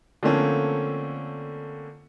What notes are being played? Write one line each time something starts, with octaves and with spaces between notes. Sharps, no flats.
D3 F3 A3 A#3 C4 C#4